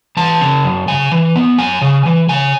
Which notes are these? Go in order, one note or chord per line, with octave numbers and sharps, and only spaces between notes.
E3 A5
C#3
F#2
C#3 G#5
E3
B3
F#2 G#5
C#3
E3
C#3 G#5